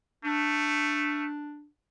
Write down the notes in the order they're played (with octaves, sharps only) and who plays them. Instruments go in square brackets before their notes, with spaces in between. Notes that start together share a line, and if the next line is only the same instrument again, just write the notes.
[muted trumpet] A3 [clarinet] D4